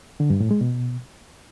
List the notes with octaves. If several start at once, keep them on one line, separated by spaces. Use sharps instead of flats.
D3
G2
A2
G#3
B2